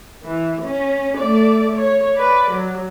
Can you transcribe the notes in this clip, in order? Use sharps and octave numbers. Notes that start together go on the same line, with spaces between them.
E3
C#4
A3 D5
C#5
B4 D5
F#3